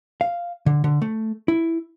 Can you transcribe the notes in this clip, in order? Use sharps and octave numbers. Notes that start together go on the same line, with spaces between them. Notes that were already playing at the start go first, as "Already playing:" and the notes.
F5
D3
D3
A3
E4